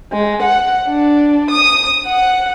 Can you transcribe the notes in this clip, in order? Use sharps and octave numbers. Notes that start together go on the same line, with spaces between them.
G#3
F#5
D4
D#6
F#5